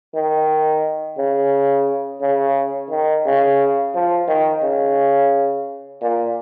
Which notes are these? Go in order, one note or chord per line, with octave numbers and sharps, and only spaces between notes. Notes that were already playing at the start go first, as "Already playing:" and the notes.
D#3
C#3
C#3
D#3
C#3
F3
D#3
C#3
A#2